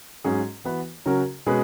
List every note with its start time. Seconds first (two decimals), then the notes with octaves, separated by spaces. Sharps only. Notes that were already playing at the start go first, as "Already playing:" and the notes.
0.24 G#2 F#3 C#4 G#4
0.64 E3 B3 F#4 B4
1.06 C#3 F#3 C#4 F#4 A#4
1.46 B2 G#3 C#4 G#4 B4